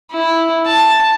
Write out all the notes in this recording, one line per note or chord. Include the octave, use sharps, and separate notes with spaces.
E4
A5